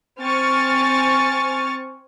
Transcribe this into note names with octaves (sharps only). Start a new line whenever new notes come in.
C4 G#5 C#6 F6 A6